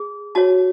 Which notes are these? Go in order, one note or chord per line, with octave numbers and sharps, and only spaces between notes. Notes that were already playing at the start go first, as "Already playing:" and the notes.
Already playing: G#4
F#4 C#5 A5